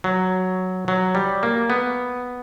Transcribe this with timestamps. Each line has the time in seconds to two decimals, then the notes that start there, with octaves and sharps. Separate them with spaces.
0.04 F#3
0.88 F#3
1.15 G3
1.43 A#3
1.70 B3